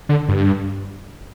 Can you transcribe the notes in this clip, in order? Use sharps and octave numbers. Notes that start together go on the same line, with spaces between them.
D3
G2